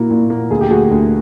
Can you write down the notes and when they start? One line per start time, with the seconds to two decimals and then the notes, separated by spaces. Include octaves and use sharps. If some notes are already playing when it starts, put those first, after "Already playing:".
Already playing: A#2 A#3 E4 F#4
0.11 A#2
0.30 A#3
0.50 D2 G#4
0.61 G4
0.70 D2 F#4 G#4
0.91 D2